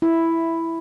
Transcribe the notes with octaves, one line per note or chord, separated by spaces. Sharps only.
E4